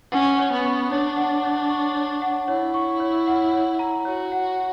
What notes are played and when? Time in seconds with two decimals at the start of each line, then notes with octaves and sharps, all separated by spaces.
0.12 C#4 F#5
0.39 C#5
0.52 B3
0.65 C#6
0.91 D4 C#5
1.17 F#5
1.43 C#5
1.70 C#6
1.95 C#5
2.22 F#5
2.48 E4 C#5
2.74 C#6
3.00 C#5
3.27 F#5
3.53 C#5
3.79 A#5
4.05 F#4 C#5
4.32 F#5